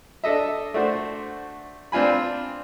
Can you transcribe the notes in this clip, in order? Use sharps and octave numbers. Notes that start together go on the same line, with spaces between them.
D4 A4 D#5 E5
A3 D4 F#4 C5
C4 D4 F4 G#5 B5